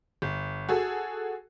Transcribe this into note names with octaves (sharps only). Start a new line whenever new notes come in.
G1
F#4 G#4 A4